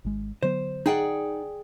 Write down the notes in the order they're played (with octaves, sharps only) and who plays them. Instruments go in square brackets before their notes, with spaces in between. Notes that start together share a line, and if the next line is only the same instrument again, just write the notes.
[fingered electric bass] G#1 G#3
[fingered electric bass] D3 F#3 B3 [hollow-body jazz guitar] C5
[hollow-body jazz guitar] D#4 F#5 [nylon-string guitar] G#4 D5 G5